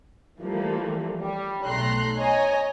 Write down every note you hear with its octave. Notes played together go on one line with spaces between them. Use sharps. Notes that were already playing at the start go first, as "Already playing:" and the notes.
E3 F3 G3 A3 A#3
G3
B1 A3 A#5 C6 F#6
C#5 D#5 G#5 A#5